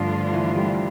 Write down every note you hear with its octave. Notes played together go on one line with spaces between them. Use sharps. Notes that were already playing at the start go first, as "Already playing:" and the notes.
Already playing: G2 D3 F3 A3 D4 F4
E3
G3